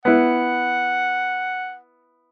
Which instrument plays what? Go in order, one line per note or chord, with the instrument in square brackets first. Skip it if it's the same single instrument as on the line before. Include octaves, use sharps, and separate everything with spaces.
[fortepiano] B3 E4 [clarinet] F#5